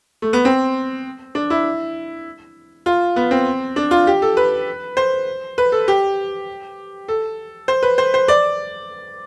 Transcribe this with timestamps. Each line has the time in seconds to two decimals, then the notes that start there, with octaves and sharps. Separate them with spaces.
0.22 A3
0.33 B3
0.45 C4
1.35 D4
1.50 E4
2.86 F4
3.16 B3
3.31 C4
3.76 D4
3.91 F4
4.07 G4
4.22 A4
4.37 B4
4.97 C5
5.58 B4
5.72 A4
5.88 G4
7.08 A4
7.68 C5
7.83 B4
7.98 C5
8.14 C5
8.28 D5